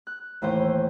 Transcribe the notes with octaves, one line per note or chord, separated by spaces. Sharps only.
F#6
D#2 A2 E3 C5 G6